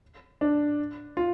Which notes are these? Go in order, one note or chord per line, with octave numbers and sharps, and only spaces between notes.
D4
F4